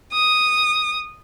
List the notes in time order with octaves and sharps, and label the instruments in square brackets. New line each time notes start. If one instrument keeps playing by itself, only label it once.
[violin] D#6